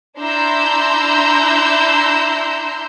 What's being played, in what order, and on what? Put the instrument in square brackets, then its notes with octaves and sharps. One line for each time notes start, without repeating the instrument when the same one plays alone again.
[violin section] D4 E4 A#5 C6 E6 G6